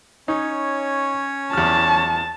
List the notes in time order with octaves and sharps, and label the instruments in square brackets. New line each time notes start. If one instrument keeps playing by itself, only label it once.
[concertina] C#4 C#5 [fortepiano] D#4
[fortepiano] E2 F6 [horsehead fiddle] A5